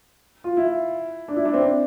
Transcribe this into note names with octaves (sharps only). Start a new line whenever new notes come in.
F4
E4
D4
E4
D4
C4
D4